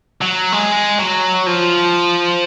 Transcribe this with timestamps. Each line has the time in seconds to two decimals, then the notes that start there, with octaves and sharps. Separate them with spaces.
0.21 F#3
0.53 G#3
1.00 F#3
1.47 F3